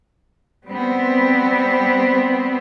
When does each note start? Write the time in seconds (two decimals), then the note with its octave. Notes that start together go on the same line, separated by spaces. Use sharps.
0.66 G3 B3 C4